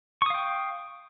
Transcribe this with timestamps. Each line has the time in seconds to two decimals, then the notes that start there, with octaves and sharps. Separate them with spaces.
0.22 C#6
0.26 D#6
0.30 F5
0.34 G5